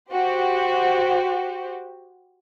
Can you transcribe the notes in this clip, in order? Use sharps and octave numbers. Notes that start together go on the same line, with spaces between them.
F#4 G4 C5